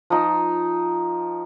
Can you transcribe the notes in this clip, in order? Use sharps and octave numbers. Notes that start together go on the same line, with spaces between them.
F3 D#4